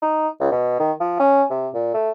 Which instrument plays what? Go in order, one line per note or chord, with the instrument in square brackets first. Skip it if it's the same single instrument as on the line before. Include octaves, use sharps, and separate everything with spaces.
[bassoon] D#4
C#2
B2
D#3
F3
C#4
C3
A#2
A3